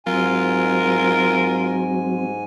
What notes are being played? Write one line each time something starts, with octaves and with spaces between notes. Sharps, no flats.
G#2 F#3 C4 F4 A#4 G#5